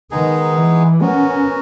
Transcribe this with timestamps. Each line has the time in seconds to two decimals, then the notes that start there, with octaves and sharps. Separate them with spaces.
0.11 D#3 G#3 B3 D#4 G#4
0.57 E3
1.01 B3 C#4 F#4 A#4